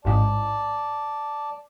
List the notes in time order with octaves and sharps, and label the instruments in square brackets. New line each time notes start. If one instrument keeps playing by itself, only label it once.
[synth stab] A1 G#2 [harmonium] D5 A5